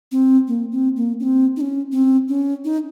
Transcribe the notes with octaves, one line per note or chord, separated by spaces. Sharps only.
C4
A#3
C4
A#3
C#4
C4
D#4
C#4
C4
C#4
D#4